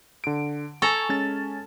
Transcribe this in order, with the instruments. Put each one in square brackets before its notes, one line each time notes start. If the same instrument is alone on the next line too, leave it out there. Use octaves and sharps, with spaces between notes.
[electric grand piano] D3 D7
[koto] A4 A#5 [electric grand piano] G#5 C#6
[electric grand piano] G#3 C#4 A6